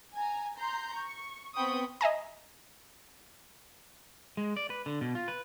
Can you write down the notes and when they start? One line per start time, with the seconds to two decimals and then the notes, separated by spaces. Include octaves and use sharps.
0.14 G#5 A#5
0.55 A#5 C6 G6
0.94 C#6
1.55 B3 C4 G5 B5 C#6 D#6
2.01 D#5 E5 G#5 A#5
4.37 G#3
4.56 D5
4.70 B4
4.86 D3
5.01 B2
5.15 F4
5.28 B4